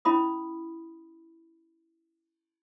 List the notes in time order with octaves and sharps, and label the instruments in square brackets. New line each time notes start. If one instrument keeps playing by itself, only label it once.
[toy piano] C#4 E4 B5 D#6